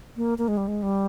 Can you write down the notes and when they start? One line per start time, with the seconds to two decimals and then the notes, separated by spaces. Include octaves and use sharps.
0.16 A#3
0.38 A#3
0.48 G#3
0.57 G3
0.68 G#3
0.82 G3